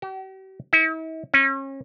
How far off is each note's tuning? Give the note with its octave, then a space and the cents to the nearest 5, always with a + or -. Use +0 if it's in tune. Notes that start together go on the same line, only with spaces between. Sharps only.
G4 -45
E4 -45
C#4 -35